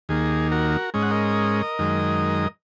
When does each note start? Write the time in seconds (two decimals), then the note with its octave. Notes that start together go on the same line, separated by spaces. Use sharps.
0.09 D#2 D#3 A#3 G#4
0.52 F#4 A#4
0.94 G#2 G#3 C#4 D#5
1.02 F#5
1.11 A#4 D#5
1.79 F#2 D#3 G#3